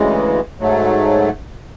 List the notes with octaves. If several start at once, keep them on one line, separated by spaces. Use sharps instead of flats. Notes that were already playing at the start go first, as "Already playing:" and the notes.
Already playing: D2 C#3 E3 G#3
G#2 F#3 A3